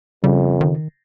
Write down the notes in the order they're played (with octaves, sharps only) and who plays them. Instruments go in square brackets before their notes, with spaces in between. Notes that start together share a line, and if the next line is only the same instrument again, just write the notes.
[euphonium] F2 [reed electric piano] C#3 [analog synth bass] G3
[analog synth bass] D#3